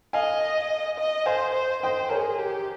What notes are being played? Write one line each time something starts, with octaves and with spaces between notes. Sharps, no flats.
D#5 F5 G#5
D#5
C5 F5 G#5
C5
C5 D#5 G5
G#4 A#4 C#5
G4